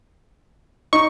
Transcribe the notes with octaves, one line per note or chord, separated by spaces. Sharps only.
D#4 C#6